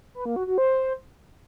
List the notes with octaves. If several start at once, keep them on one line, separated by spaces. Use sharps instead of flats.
B4
A#3
F#4
F#4
C5